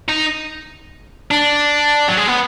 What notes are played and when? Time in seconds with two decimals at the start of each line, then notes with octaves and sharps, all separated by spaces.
0.08 D#4
1.31 D4
2.08 F#3
2.17 G#3
2.27 B3